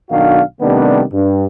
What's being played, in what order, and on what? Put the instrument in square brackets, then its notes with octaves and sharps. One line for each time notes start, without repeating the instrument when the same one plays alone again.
[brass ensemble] B1 D#3 D4 F#4 F5
C3 D#3 G3 A3 B3 D4
G2